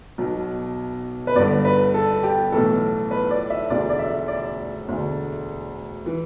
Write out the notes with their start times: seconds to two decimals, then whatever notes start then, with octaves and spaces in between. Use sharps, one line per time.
0.18 B1 B2
1.27 B4
1.35 G1 G2 D3 D5
1.65 B4
1.94 A4
2.23 G4
2.52 B1 A2 E3 A4
3.11 B4
3.31 D5
3.50 E5
3.69 E1 D2 D3 D5
3.90 D5
3.99 E5
4.28 D5
4.87 E1 D2 D3
6.06 E3